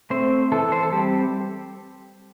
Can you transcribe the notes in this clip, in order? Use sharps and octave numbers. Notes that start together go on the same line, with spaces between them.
A3 C4 C5
E3 A4
C5
A4
G3 C4 G4